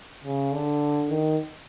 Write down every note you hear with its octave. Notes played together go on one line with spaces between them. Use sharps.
C#3
D3
D#3